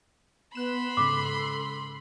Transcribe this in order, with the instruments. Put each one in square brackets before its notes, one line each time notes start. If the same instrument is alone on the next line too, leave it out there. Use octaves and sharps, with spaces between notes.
[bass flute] B3 [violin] B5 C6 [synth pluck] F#6 E7
[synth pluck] G#2 C#3 [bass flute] A4 [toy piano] D6